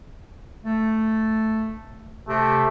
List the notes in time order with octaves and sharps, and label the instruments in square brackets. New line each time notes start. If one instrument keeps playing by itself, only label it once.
[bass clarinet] A3
[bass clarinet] C3 [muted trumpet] A3